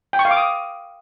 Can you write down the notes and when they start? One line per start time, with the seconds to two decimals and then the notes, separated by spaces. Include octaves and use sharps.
0.13 G5
0.19 C#6
0.25 F5
0.31 D6
0.37 D#6